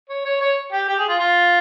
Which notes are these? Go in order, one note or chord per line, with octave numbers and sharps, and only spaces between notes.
C#5
C#5
C#5
G4
G4
G#4
F4
F4